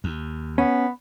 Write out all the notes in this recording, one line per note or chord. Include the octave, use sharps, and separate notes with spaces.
D#2
B3 C#4